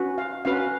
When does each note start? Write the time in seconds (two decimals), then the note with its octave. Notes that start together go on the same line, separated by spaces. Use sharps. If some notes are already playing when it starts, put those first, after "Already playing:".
Already playing: C#4 F#4 B4
0.18 F5
0.45 C#4 F#4 B4 F5